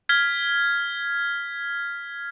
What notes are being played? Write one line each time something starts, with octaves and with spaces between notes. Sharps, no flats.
F6 G#6 B6